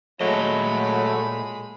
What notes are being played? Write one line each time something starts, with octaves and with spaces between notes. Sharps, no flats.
A#2 F#3 G#3 A3 D#5 B5